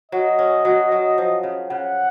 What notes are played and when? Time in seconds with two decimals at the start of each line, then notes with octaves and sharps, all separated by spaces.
0.12 F#3 D#5
0.39 C#4
0.65 F#3
0.92 F#3
1.18 F3
1.43 C#3
1.70 C#3 F#5